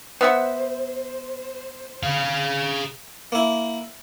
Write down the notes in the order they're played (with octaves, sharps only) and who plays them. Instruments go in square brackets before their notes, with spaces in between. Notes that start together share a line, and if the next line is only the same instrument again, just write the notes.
[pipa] B3 E5 F#5 [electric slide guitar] C5
[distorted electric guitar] G#4 F5
[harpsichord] A#3 E4